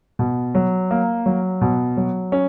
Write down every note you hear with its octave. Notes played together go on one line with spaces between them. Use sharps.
B2
F#3
A#3
F#3
B2
F#3
C#4